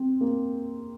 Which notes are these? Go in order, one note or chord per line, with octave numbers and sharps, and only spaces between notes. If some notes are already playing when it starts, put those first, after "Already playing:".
Already playing: C4
A#3